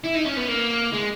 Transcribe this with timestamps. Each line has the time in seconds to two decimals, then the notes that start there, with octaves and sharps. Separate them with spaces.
0.04 E4
0.15 D#4
0.26 C#4
0.37 B3
0.48 A#3
0.93 G#3